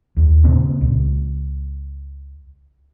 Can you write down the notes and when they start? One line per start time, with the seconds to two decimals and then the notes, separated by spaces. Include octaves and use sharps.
0.17 D#2
0.44 A#2 C#3 C4
0.81 C#2